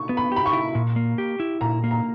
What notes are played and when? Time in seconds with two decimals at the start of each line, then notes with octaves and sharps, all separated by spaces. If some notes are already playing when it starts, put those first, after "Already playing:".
Already playing: C#6
0.09 B3
0.17 B5
0.32 G4 B5
0.46 C#6
0.53 E4
0.75 A#2
0.96 A#3
1.18 G4
1.40 E4
1.61 A#2 A#5
1.84 A#3
1.91 A#5